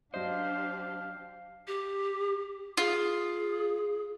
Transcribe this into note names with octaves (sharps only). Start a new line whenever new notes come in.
F#3 D4 G4 C5 D#5 F5
G4
F4 G#4